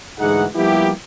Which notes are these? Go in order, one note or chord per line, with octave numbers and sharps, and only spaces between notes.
D2 G#2 E3 D#4 G#4 F#5
F3 G3 A#3 B3 E4 G4